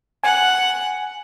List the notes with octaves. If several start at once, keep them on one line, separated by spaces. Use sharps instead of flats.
F#5 G#5